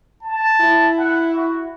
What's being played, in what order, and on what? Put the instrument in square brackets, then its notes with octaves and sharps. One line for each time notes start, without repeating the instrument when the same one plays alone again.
[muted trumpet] A5
[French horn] E4
[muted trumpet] F#5
F#4